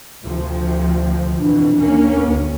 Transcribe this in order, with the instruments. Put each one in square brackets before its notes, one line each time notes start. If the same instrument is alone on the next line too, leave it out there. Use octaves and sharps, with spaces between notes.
[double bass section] D2 C3 F3
[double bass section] F2 B2 E3 [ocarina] D4
[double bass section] D#2 A#3 C#4
D2